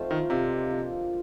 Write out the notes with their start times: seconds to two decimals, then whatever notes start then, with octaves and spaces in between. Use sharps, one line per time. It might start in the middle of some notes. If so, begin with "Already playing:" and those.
Already playing: F3 A3 C4 D#4 F4 C5
0.11 D#3
0.30 C3 D#4 A#4 D5 F5
0.70 F3 A#3 D4